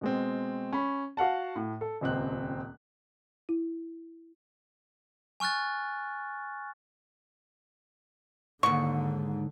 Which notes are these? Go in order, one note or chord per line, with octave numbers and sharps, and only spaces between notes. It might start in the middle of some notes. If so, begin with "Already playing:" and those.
B2 G#3 C4
C#4 B5
F#4 F5 F#5 A5
A2
A4
D#1 C#2 C4 F#6
E4
G#5 C#6 F6 F#6 A6
D#2 G#2 D3 C#6